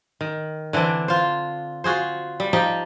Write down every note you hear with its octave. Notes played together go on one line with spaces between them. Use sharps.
D#3
D3 E3 C4 D4
F4 C5
F4 F#4 G#4 C5
G3
F3 D#4 G4